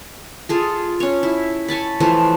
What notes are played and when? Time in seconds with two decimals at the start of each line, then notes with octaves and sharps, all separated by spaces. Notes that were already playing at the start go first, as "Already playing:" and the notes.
0.49 F4 G#4 A4
1.00 C#4 C#5
1.23 E4
1.68 C#5 G#5 A5 B5
2.00 E3 F3 A3 F4